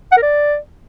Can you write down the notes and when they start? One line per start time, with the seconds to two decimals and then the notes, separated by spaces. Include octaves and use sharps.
0.12 F#5
0.17 A#4
0.23 D5